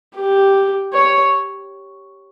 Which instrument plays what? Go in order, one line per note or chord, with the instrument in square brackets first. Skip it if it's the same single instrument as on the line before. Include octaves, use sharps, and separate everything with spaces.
[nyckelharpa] G4
C#5